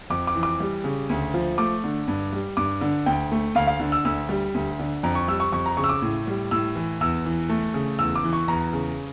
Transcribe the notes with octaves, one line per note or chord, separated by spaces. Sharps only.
F2 D6
D6
E3
D6
G3
C#3
D2
F3
A3 D6
D3
G2
G3
G2 D6
D3
D2 G5
A3
D2 F5
F5
D3
E6
D2 E6
G3
D2
D3
F2 A#5
C#6
G3 E6
C#6
F2 C#6
A#5
C#3 C#6
E6
D6
A2
G3
A2 E6
E3
E2 E6
E3
A3
C#3
E2 E6
D6
E3
C#6
E2 A#5
C#3